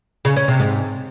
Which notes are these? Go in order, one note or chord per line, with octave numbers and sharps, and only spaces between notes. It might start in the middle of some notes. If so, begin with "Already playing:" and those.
C#3
C#4
C3
G#2